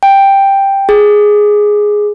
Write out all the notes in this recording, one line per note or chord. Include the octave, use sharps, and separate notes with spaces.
G5
G#4